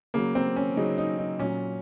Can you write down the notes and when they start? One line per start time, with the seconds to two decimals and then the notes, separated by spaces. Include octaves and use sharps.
0.14 C#3 F#3 A#3
0.35 C4
0.56 C#4
0.77 C#3 F#3 D#4
0.98 D#4
1.18 D#4
1.39 A#2 F#3 C#4